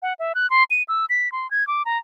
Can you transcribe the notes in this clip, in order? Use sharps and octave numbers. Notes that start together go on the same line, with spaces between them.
F#5
E5
F#6
C6
D#7
E6
B6
C6
G#6
D6
A#5